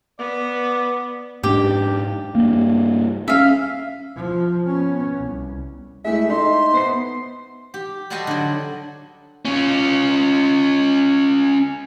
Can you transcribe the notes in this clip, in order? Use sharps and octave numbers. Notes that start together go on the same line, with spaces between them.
B3 D5
G#2 D4 G4
G2 A#3
C#4 E5 F5
F3
B3 C#4
C2
G#3 A3 E4 E5
D#4 C6
B3 C5 C7
G4
G3 F#4 A4 C5 D5 D#5
D3 F#3
C#4 F4